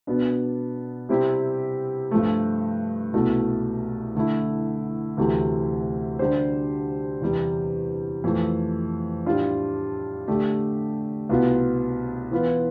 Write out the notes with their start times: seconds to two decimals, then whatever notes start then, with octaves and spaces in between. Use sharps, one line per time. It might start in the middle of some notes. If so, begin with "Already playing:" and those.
0.07 B2 B3 D4
1.09 C3 G3 C4 E4 G4
2.11 G2 F3 A3
3.14 C2 B2 A3
4.15 D3 A3 E4
5.17 D2 C3 E3 A3
6.19 D3 G3 D4 G4 C5
7.22 E2 C3 G3
8.24 F2 E3 A3
9.26 A2 G3 D4 F4
10.28 D3 A3 D4 G4
11.29 C2 B2 B3 F4
12.31 E3 B3 F4 B4